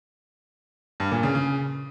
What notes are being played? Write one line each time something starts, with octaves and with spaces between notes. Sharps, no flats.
G2
A#2
C#3
C#3